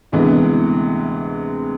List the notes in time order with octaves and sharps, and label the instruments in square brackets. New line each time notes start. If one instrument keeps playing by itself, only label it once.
[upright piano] D2 C3 E3 G#3 B3